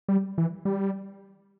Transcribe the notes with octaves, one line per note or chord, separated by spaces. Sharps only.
G3
E3
G3